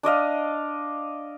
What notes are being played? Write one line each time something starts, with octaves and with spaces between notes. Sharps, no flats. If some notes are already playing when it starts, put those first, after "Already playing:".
D4 D5 D#5 F5